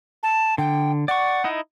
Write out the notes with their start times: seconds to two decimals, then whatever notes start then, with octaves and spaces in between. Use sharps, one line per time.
0.23 A5
0.58 D3 G5
1.08 D5 F#5 C#6
1.44 D#4 E4 D#5